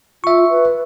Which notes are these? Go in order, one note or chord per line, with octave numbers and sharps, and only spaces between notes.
F4 E5 C#6
B4